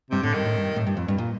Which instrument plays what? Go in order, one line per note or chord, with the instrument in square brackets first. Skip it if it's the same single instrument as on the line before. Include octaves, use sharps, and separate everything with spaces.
[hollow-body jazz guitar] G2 [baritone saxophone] C3
[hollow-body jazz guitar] A2 [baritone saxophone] D3
[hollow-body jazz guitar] G2 [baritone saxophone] D#3
[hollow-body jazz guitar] A2
G2
A2
G2
F2
G2
A#2